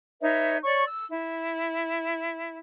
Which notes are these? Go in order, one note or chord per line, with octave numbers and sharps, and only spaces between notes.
D#4 B4 C#5 E5
C#5 D5 C#6
E6
E4